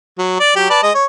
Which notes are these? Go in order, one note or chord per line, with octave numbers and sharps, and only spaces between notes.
F#3
D5
F#3 G4
B4 D5 A5
G#3 D#5
C#5